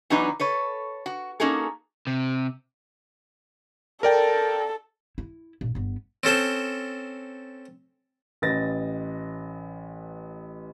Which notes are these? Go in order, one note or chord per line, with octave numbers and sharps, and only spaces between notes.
E3 F#3 B3 D4 D#4 B4
A4 B4 C#5
F#4
A#3 C#4 D#4 F#4 G#4 A4
C3
A4 A#4 D5 G5
E4
A#1
G1 B3
C4 C#4 A4 C5
A1 B4 D#5 A6 A#6